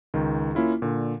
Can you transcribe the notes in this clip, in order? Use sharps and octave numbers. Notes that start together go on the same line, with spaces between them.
C#2 D#3
A#3 C#4 E4 F4
A#2 D3